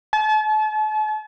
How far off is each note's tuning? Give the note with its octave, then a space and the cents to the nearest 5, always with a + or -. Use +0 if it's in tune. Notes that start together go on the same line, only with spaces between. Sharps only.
A5 -40